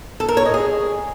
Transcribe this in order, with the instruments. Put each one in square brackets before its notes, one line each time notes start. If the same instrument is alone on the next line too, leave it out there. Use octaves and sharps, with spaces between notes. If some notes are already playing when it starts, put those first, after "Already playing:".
[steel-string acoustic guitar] A4
A#4
C#5
D#5
G#4